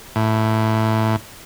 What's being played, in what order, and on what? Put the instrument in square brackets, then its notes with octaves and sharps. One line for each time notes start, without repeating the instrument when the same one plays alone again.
[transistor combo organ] A2